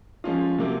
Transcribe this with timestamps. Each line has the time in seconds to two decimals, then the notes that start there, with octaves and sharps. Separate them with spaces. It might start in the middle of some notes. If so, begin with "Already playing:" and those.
0.24 F3 G#3 C#4 F4
0.58 C3 F#3 A#3